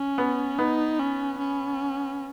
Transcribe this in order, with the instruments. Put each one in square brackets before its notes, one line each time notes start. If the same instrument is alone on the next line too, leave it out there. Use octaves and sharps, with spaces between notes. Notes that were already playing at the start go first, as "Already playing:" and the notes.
Already playing: [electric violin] C#4
[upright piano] B3
[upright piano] B3 [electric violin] D#4
[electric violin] C#4
C#4